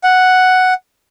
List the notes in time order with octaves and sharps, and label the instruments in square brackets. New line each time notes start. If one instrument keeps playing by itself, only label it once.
[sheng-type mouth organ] F#5